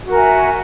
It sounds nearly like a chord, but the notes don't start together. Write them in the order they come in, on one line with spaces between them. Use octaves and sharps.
F#4 A#4 G#5 E5